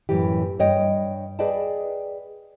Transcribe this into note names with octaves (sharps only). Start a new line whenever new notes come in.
F#2 A2 E3 G4
G2 C#5 D#5 G5
G#4 B4 D5 D#5 G5 A5